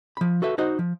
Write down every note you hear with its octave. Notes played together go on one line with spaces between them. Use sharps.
F3 B5
F#4 A4 B4 E5
D#4 F#4 C5 D#5
F3